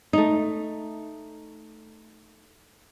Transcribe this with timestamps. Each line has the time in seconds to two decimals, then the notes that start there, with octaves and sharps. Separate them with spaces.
0.13 A3 D#4